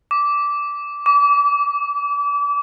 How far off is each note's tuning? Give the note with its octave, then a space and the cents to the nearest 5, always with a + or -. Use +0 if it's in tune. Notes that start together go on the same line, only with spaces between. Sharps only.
D6 -15
D6 -35